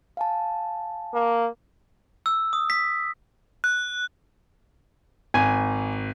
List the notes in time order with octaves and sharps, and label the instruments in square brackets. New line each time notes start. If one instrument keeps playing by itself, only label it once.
[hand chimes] F5 G#5 A5
[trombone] A#3
[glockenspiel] E6
D#6
B6
[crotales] F#6
[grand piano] G#1 [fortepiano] G#5